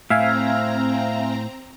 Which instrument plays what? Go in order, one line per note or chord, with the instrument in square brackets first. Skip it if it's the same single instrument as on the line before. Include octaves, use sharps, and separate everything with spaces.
[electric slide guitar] A2 [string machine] C4 A#5 [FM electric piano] E5 F5 G#5